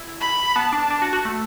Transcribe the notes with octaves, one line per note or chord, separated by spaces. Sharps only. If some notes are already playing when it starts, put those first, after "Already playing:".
Already playing: E4
B5
B3 A5
D4
D4
F#4
F#4
A3